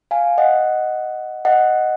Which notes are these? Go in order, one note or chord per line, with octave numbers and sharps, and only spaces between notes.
F5 G#5
D#5 F#5
D#5 F#5